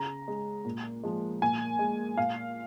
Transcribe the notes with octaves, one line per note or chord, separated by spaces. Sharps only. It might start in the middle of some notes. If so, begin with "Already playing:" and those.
Already playing: C#3 A#5
G#3
A#2
F3 G#3
A#2 G#5
G#3
A#2 F5